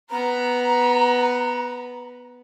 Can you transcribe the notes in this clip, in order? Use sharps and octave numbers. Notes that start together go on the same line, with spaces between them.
B3 B4 A#5